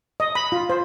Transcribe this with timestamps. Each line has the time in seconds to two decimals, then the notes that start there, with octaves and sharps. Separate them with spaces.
0.20 D#5
0.35 B5
0.52 F4
0.70 C5